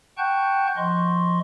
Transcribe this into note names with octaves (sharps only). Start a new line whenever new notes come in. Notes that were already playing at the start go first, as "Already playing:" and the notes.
F#5 G5 A5 C#6 F#6 G6
F3 D#5 C6 C#6